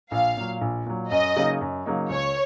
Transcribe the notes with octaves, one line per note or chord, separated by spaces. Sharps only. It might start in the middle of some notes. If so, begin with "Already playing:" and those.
A#1 F5
A#2 F#3
A#1
A#2 F#3
F#2 D#5
C#3 F#3 A#3 D#4
F#2
C#3 F#3 A#3 D#4
C#2 C#5